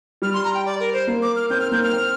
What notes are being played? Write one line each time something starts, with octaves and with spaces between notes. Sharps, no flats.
G3 F6
C6
A#5
G5
D5
A#4
C5
A#3
D6
F6
C4 G6
F6
A#3 G6
F6
C4